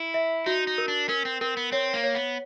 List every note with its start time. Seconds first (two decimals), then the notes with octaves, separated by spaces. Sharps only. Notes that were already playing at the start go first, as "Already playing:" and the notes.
Already playing: E4
0.14 E5
0.46 D#4 F#4
0.67 D#4
0.78 A#4
0.88 D4
1.09 C#4 A#4
1.25 C4
1.41 C4 A#4
1.57 B3
1.72 C4 C#5
1.94 A#3
2.04 C#5
2.15 B3